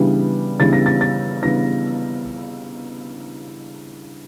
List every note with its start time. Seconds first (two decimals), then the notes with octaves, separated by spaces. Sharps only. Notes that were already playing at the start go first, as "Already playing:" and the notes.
Already playing: C#3 E3 G3 B3 D4
0.60 C#3 E3 G3 B3 D4 A6
0.73 A#6
0.86 A6
1.01 A6
1.43 C#3 E3 G3 B3 D4 A#6